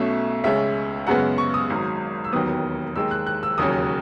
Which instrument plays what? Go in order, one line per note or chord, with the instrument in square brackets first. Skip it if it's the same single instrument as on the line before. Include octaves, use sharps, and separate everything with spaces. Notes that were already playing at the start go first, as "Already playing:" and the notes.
Already playing: [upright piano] B1 B2 A3 C#4 E5
C#2 C#3 G#3 C#4 E5
F#2 C#3 G#3 B3 F#5
C#6
D#6
G#1 G#2 F#3
E6
E1 D#2 D#3 F#3 B3 D#6
D#2 D#3 G#3 E6
F#6
F#6
E6
E1 D#2 C#3 F#3 C#4 D#6